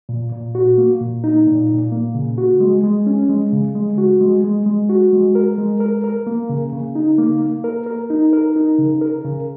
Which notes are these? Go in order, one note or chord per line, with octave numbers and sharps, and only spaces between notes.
A#2
A#2
F#4
A#3
A#2
D#4
A#2
A#2
A#3
C#3
F#4
G#3
G#3
C#4
G#3
C#3
G#3
F#4
G#3
G#3
G#3
F#4
G#3
A#4
G#3
A#4
A#4
A#3
C#3
C#3
D#4
A#3
A#3
A#4
A#4
D#4
A#4
D#4
C#3
A#4
C#3